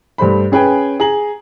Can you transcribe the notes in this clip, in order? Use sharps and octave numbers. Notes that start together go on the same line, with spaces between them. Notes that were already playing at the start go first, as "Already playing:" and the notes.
G2 A3 C5 B5
C#4 G#4 B4 G5
G#4 A#5 F#7